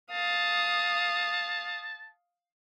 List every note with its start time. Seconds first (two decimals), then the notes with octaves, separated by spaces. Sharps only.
0.12 F5 A5 D#6